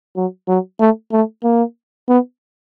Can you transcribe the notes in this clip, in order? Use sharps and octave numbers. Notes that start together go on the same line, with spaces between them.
F#3
F#3
A3
A3
A#3
B3